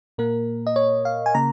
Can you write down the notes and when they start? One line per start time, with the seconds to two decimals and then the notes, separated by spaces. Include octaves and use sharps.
0.18 A#2 A#3 A#4
0.67 D#5
0.76 C#5
1.05 F5
1.26 G#5
1.35 C#3 A#3 A#5